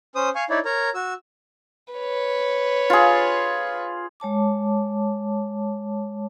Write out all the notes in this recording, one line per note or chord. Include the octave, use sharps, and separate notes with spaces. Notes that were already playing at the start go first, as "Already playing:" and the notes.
C#4 C5 D#6
F5 G#5 C#6
D#4 E4 C#5 D5
A#4 C#5 A#5
F#4 E6
B4 C#5
F4 G#4
G#3 C#5 A5 D6